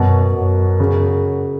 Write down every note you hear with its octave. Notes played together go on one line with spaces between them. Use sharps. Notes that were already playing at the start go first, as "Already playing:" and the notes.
Already playing: F#2 B2
F#2
C#3